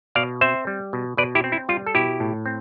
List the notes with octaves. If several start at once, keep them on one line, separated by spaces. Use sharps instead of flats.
B2 D5 F5
C4 C5 E5
G3
B2
B2 B4 D5
E4 G4
C4
E4
G3 F4
A4
B2 E4 G4
A2
C4